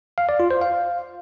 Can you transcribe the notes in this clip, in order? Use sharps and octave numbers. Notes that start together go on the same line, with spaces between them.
F5
D5
F4
C5
F5